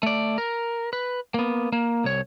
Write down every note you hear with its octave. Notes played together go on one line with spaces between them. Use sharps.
A3 D5
A#4
B4
A#3 B3
A#3
C2 C#5